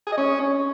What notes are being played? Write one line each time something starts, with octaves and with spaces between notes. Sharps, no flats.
G#4
D#5
C#4